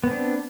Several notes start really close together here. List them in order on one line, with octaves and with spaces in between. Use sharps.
B3 C4 D4